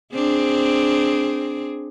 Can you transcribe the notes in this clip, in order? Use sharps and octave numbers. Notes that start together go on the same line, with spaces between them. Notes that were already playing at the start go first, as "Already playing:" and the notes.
C4 D4 G#4